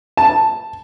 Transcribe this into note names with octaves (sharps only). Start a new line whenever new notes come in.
A5